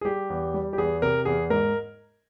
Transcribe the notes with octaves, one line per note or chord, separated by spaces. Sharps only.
G#4
G3 G4
E2
G3
G4
E2 G#4
C3 A#4
E2 G#4
G#2 A#4